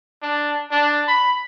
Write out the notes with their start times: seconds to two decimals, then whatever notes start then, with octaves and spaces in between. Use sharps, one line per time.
0.22 D4
0.71 D4
1.08 B5